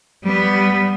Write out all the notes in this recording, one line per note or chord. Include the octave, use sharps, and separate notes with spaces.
G3 B3